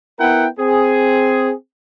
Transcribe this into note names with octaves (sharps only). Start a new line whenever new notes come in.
B3 E4 A#4 F#5 G5
C4 G#4